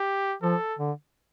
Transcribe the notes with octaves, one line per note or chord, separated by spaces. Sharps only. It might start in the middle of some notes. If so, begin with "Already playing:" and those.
Already playing: G4
F3 A4
D3